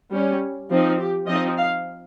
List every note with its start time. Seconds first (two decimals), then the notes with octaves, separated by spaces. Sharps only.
0.13 G3 C#4
0.71 F3 C4 D#4
0.99 G4
1.28 F3 C4 D#4 D#5
1.57 F5